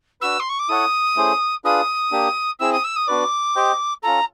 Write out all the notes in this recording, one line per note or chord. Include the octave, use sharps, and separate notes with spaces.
D4 F#4 B4 E6
C6
C#6
D6
E4 A4 C#5 F#5 D#6
A3 C#4 E4 G#4 C5
D4 F4 G#4 B4 D#6
A#3 D4 G4
C4 E4 G#4 E6
D#6
E6
D#6
B3 D4 F#4 B4 D5 D6
G4 C5 D#5 G5
C#4 F4 A4 A#5